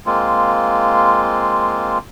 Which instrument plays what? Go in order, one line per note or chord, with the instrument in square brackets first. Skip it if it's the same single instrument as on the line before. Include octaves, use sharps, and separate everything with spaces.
[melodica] G#3 A#3 C4 F4